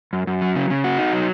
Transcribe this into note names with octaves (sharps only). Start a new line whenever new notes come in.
F#2
F#2
F#3
C#3
C#3
F#4
D#4
F#3